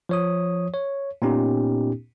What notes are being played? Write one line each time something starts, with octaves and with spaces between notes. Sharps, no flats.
F3 C#5 D#6
C#5
A#2 B3 C#4 D#4 G4